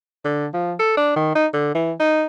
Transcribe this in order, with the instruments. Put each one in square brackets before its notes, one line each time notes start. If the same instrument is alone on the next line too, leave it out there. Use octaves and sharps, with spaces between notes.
[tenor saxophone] D3
F3
A4
D4
D#3
D#4
D3
E3
D#4